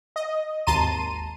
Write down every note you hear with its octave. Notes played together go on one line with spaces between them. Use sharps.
D#5
G#1 D#2 A5 A#5 C6 D#7